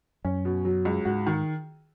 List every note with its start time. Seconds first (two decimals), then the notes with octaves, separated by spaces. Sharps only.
0.25 F#2 C#4
0.45 B2
0.65 F#3
0.85 C#2
1.05 G#2 F#4
1.26 D#3